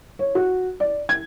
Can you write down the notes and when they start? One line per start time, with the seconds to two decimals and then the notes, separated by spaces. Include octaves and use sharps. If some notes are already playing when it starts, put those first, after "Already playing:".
0.19 C#5
0.35 F#4
0.80 D5
1.09 G#6